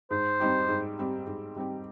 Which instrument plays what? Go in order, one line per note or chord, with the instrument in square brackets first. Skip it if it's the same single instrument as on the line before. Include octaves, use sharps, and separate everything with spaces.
[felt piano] G#2 [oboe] C5
[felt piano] G3 C4 D#4 G4
G#2
G3 C4 D#4 G4
G#2
G3 C4 D#4 G4